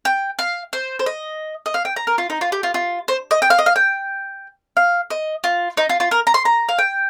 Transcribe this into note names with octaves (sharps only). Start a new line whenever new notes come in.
G5
F5
C5
C5
D#5
D#5
F5
G5
A#5
A#4
F4
D#4
F4
G4
F4
F4
C5
D#5
G5
F5
D#5
F5
G5
F5
D#5
F4
D#4
F4
F4
A#4
A#5
C6
A#5
F5
G5